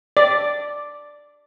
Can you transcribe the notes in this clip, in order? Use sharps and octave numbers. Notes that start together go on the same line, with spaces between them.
D5